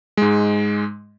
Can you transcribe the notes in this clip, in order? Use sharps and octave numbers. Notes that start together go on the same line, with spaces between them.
G#2 G#3